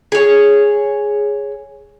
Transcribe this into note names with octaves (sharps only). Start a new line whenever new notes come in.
G#4 C#5